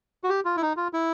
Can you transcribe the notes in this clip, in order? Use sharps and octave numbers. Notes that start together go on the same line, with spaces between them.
F#4
G4
F4
E4
D#4
F4
E4